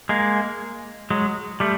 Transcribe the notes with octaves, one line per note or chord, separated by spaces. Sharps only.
G#3 A#3
F#3 G#3
G3 A3